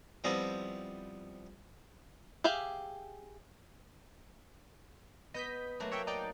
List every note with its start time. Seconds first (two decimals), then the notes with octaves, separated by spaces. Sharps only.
0.24 F3 G3 B3 C4 E4 D#5
2.44 G4 G#4 E5 F5 G5
5.34 B3 D#5 G6 B6
5.80 F#3 A3 A#3
5.92 C#5 E5 G5
6.07 D#4 D5 G5